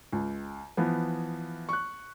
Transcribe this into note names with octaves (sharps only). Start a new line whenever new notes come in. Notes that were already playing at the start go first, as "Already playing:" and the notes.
C#2
E3 F3 B3
C#6 F#6